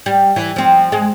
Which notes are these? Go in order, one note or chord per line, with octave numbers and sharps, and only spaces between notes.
G3
E3
F3 C4
G#3